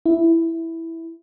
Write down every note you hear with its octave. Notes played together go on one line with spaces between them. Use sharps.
E4